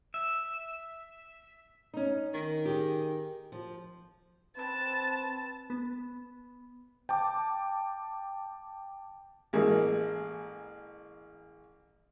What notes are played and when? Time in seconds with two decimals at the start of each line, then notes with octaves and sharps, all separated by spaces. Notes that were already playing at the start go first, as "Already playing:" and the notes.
0.14 E5
1.94 C#4 D#4
2.34 D#3
2.66 G4 G#4
3.52 F3
4.56 C4 B4 A5
5.70 B3
7.09 G5 A5 D6
9.53 A1 G#3 A#3